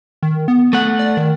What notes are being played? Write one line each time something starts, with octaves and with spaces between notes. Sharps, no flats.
D#3
B3
A3 F#5
D5
D#3